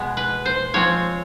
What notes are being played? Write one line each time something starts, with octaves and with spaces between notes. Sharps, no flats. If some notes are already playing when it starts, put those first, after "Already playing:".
Already playing: B2 G#3 B3
B4
C5
F3 G#3 C4 C#5